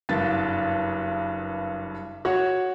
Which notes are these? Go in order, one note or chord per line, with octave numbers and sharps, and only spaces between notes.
F#1 G2 A6
F#4 C#5 F#5